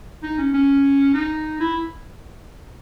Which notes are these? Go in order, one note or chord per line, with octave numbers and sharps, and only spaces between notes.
D#4
C#4
C#4
D#4
E4